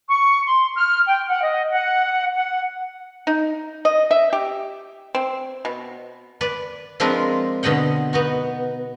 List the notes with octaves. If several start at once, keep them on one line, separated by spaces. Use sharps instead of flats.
C#6
C6
F6
G5
F#5
D#5
F#5
F#5
D#4
D#5
E5
G4
C4
B2
B4 D5
F3 G#3 C4 D4 A#4 B4
B2 D3 D#5 F#5 G5
B3 D#4 F#4